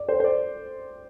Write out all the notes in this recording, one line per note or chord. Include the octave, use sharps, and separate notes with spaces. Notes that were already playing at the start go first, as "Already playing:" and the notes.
Already playing: D5
C5
C5
D5